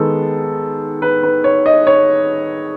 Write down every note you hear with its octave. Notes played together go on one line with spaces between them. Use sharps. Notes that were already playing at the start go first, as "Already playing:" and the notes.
Already playing: D#3 G#3 B3 A4
B4
B4
C#5
D#5
C#5